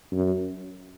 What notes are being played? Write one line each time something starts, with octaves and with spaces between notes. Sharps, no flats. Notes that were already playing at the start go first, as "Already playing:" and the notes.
F#2